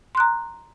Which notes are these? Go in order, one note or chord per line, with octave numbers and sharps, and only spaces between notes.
A#5 C6 F#6